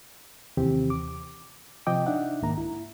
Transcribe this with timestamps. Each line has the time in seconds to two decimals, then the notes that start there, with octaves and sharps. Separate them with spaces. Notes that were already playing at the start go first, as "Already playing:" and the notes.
0.57 D#2 C3 D#3 E3 C4 G4
0.90 D6
1.87 C3 F3 D#5 G5 D6
2.06 D4 D#4 E5 F#5
2.42 C2 G#2 D#3 A#3 A#5
2.58 E4